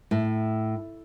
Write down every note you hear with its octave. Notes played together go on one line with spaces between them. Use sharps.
A2